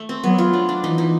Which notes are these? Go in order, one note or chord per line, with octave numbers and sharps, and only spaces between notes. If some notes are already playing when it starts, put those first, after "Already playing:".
Already playing: A3
C4
F#3 B3
F4
D4
D4
E3 D#4
D#4